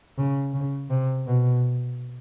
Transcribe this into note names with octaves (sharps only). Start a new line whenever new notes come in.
C#3
C#3
C3
B2